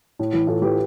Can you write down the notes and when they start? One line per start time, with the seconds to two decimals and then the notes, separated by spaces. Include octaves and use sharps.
0.19 A2
0.33 E3
0.47 A2 F4 A4
0.61 E3 G4 B4